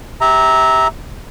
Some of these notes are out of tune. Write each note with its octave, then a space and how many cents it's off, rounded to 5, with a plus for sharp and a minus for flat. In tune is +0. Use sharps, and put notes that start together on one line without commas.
G4 +0 E5 -20 A#5 +0